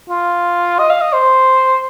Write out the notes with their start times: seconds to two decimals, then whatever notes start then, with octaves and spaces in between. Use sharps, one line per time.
0.09 F4
0.79 D#5
0.90 F5
1.01 D#5
1.13 C5